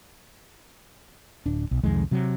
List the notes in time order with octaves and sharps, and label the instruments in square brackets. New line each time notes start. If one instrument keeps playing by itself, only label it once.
[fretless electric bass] D1 D4
B1
C2 F2 D#3 G#3
C3 F#3